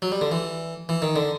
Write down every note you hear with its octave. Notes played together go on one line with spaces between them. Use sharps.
F#3
G3
D3
E3
E3
D#3
D3